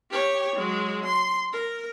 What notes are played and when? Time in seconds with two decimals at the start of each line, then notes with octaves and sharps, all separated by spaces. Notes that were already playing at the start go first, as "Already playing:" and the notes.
0.10 G4 C#5
0.56 F#3 G#3
1.05 C6
1.53 A#4